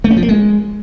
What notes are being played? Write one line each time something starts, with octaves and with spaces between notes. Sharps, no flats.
A3
C#4
F3
A#3
G#3